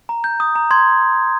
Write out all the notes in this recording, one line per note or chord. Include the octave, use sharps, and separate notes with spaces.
A#5
G6
D#6
A#5
C6 G#6